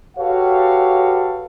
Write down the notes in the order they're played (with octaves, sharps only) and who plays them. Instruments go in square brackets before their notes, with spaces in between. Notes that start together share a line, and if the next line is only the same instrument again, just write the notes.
[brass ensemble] F#4 G4 A4 B4 C#5 F5